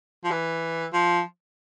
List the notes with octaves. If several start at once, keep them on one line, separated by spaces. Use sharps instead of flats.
F3
E3
F3